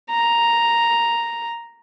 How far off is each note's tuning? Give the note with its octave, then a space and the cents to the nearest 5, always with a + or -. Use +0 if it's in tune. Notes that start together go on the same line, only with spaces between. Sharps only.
A#5 +0